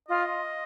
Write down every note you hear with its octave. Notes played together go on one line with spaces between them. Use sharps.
F4 D#5